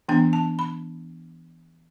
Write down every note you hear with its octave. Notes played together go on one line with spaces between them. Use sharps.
E3 B3 D4 G5
A5
B5